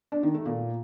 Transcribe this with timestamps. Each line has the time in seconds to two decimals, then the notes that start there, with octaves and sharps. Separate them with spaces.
0.12 D4
0.23 D#3
0.34 A3
0.46 A#2